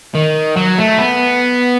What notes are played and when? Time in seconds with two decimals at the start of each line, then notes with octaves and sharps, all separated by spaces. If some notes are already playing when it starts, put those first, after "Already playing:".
0.15 D#3
0.56 F#3
0.78 A3
0.98 B3